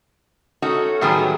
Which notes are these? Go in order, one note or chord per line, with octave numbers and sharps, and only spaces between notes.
A3 C#4 D#4 F#4
A2 D#3 F#3 G3 B3 G#4